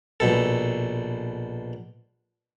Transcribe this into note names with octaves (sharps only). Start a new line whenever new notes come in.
A#1 B2 A4